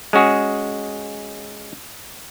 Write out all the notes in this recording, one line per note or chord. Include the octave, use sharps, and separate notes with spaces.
G#3 C#4 F#4 G#4